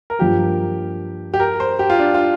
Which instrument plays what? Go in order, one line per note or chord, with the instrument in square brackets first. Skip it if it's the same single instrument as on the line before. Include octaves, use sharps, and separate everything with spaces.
[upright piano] A#4
[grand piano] G2 F3 A#3 [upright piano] G4
[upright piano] G4
A#4
C5
G4
F4
D4
F4